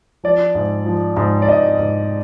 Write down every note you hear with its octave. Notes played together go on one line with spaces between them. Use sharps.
F3 D5
G#2
F3
G#2
D5
G#2 D#5
G#2